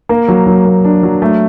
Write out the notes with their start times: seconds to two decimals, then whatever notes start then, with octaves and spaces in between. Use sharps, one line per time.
0.09 A#3
0.28 F#3
0.47 F#3
0.65 A#3
0.85 D4
1.03 F#3
1.22 A3